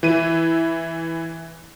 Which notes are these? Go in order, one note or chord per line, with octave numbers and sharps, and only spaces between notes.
E3 E4 D#7